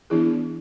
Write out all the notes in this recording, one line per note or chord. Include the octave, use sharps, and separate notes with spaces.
E3 B3 D4 E4 G#4